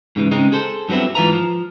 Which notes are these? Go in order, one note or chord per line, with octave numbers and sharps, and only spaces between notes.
G#2 C#3 E3
C#3 G#3 C4 D#4
G#4 A4 C5
G2 F#3 B3 C4 E4
G#2 E3 F4 B4 A#5
F3